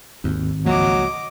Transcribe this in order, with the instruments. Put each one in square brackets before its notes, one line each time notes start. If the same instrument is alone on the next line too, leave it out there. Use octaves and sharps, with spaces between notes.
[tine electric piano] G#1 [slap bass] D#2
[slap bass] C#2 F3 A#3 [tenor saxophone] F#3 [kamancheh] D#5 D6